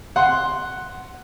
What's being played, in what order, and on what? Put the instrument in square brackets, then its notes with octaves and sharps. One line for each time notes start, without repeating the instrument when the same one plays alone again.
[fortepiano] F#5 C6